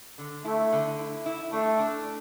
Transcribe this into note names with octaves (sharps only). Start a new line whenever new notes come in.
D3
A3 E4
D3
E4
E4
A3 D4
D4